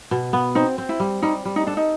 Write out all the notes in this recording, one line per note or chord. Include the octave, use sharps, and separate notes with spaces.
B2
B3
C4 D#4
C4
E4
G3
G3 D#4
G3
D#4
D4 A4
D#4